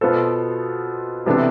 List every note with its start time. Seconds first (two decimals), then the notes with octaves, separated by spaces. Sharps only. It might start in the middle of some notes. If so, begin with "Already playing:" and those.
0.01 B2 B3 F4 A4 C5
1.26 C3 E3 B3 D4 A4